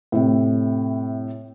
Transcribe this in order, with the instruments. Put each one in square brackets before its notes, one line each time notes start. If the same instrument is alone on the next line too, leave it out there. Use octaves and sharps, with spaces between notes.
[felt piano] A2 C3